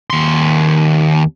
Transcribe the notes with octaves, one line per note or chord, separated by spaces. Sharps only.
D#2 C6